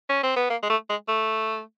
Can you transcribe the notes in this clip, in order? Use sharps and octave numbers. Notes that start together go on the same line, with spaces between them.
C#4
C4
B3
A#3
G#3
A3
G#3
A3